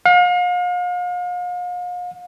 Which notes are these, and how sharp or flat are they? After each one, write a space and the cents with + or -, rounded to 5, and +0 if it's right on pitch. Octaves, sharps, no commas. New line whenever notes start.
F5 +40